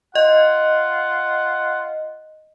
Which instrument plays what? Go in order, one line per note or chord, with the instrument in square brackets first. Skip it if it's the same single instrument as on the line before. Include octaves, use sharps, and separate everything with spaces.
[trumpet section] F4 F#5 [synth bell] D#5